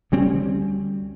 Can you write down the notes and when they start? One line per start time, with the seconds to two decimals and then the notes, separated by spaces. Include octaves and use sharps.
0.12 D2 G3 C4 C#4